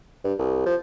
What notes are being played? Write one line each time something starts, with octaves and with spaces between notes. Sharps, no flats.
G2
C2
F3